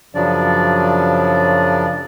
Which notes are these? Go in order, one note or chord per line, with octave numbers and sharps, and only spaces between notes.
F#2 C#3 F3 F#3 D4 D5